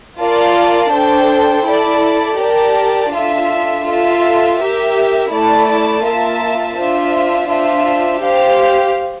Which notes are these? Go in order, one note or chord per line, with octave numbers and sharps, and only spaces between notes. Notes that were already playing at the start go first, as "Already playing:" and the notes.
F4 A#4 D5 F5 A5
D4 A4 C5 G5
E4 A4 D5
G4 A#4 D5 A5
D4 F4 A4 E5
F4 A4 E5
G4 A#4 E5
A3 E4 A4 D5 A5
A#3 F4 A#4 E5 A5
D4 F4 C5 E5
D4 F4 C5 E5
G4 C5 F5